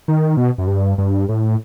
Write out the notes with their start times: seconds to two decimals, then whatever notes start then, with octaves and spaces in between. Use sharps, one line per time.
0.08 D#3
0.37 B2
0.58 F#2
0.67 G2
0.98 G2
1.29 A2